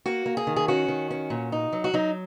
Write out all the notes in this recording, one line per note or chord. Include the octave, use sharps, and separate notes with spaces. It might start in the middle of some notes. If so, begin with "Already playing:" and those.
A#3 F#4
A#3
G#4
D#3
G#4
C#4 F#4
D#3
C#4
A#2
D#4
F#3
F#4
F#3 D#4